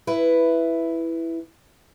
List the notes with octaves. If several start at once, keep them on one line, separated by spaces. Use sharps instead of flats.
E4 B4